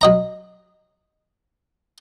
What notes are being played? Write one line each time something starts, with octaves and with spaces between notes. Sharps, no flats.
F#3 D#5 A#5